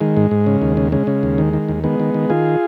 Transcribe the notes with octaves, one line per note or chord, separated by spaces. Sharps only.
D#3 G#3
G#2
G#2
C#3
D#2
C#3
C#3 G#3
C#3
D#2
D#3
D#3
D#2
D#3 G#3 B3
D#3
D#3
D#3 F4 G#4